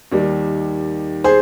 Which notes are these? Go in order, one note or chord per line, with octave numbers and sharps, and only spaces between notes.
D#2 D#3 G3
G#4 C5